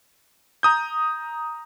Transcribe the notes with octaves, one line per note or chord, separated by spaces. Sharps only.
A#5 D#6 G6